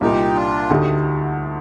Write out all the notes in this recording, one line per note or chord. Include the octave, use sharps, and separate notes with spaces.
C2 A#2 G3 D#4 G4
D4 F4
D2 D3 A3 D#4 G4